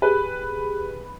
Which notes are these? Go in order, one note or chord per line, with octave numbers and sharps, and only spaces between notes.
G4 G#4 B4